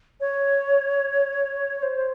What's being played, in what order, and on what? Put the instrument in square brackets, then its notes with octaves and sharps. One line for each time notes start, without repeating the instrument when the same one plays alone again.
[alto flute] C#5
C5